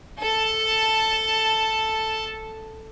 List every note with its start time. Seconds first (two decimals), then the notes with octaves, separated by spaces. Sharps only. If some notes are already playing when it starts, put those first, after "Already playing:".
0.20 A4 A5